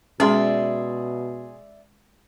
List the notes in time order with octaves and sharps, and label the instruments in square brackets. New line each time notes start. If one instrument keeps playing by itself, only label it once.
[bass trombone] B2 [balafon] G#3 C#4 [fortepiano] G#4 C6 [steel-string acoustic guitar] D5 E5